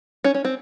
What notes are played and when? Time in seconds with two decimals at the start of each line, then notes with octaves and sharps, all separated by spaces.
0.24 C#4
0.35 C#4
0.45 C4